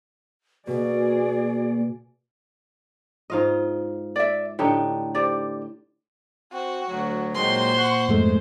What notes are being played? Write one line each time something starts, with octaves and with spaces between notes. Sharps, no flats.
B2 A#3 F#4 G#4 D5
G#2 F4 D#5
D5 E5
A2 D3 D#4 G4
G4 C5 D5
C4 F#4
D2 F#3
A#2 D#3 F#3 G#3 C5 C6
F#5 C#6 F#6
F2 G#2 G#3 A3